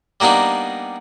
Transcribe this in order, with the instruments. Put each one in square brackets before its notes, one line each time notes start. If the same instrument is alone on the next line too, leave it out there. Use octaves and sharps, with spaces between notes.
[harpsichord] G3 A#3 B3 D4 D#4